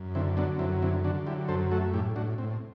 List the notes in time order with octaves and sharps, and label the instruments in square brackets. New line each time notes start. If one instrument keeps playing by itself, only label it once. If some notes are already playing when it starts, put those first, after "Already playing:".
Already playing: [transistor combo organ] F#2
D3 C4 E4
F#3 B3 D4
F#2 C4 E4
D3 C4 E4
D3 D4 F#4
F#3 E4 G4
F#2 A4 C5
A3 F#4 A4
A2 E4 G4
A2 D4 F#4
A2 C4